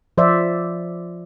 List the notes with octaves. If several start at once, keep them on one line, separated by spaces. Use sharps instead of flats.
F3 C5 D5 E5